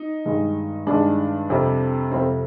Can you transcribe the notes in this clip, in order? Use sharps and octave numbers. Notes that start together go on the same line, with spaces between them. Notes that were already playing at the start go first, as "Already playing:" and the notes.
Already playing: D#4
G2 D#3 G#3
G2 D#3 G#3 D4
F2 C3 G3
F2 C3 G3 C4